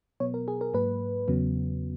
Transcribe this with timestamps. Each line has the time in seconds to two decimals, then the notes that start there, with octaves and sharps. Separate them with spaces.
0.20 B2 F#3 B3 C#5
0.34 A#4
0.48 G#4
0.61 A#4
0.74 G#2 F#3 A#3 B4
1.28 E2 C#3 F#3 B3